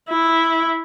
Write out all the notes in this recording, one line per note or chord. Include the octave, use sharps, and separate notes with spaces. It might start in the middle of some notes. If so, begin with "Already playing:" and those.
E4